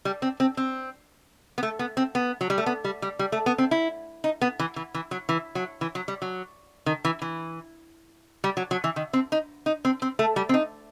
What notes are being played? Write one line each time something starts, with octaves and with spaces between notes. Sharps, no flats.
G3
C4
C4
C4
B3
A3
B3
C4
B3
F#3
G3
A3
B3
G3
G3
G3
A3
B3
C4
E4
D#4
B3
E3
E3
E3
F#3
E3
F#3
E3
F#3
G3
F#3
D#3
E3
E3
G3
F#3
F#3
E3
D#3
C4
D#4
D#4
C4
C4
A3
G3
C4
D#4